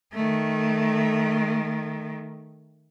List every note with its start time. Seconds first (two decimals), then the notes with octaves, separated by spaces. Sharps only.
0.13 D#3 A3